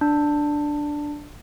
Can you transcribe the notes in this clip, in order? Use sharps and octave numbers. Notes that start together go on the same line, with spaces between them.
D4